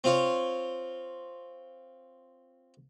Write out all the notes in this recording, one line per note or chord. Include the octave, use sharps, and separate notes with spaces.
C4 F4 C#5